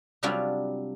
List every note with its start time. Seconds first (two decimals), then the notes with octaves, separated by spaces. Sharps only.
0.23 C3 F#3 G3 D4 F4 F#4